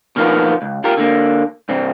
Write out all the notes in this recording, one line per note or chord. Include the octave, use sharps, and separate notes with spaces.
B2 D#3 F3 A#3 B3 F4
C#2
F4 G4 A#4
D3 A#3
C2 G2 C4